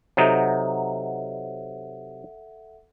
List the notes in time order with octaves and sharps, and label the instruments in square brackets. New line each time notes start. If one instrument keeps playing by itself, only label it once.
[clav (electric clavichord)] C3 F#3 D#4 [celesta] A4 E5 F#5